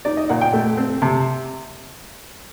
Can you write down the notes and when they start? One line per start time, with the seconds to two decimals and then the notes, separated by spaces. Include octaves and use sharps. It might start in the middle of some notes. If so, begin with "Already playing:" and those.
0.05 D#4 D5
0.17 D#5
0.29 A#2 F#5
0.41 G5
0.53 A3
0.77 C4
1.02 C3 A5